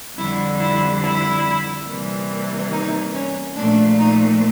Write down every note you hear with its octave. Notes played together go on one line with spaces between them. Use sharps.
F2 D3 G3 E4
E4
E4
C3 E3 G3 A#3
D#4
C#4
A#2 F3 A3 D4
D#4